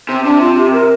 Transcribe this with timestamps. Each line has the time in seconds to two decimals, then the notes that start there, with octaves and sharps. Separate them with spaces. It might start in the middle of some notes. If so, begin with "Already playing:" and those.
0.09 C3 C4
0.24 C3 D4
0.40 F4
0.57 G4
0.72 A#4